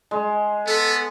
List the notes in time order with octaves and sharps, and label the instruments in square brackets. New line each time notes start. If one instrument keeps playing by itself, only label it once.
[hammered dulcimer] G#3
[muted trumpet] B3 [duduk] A4